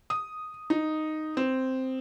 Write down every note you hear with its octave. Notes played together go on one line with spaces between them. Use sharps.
D#6
D#4
C4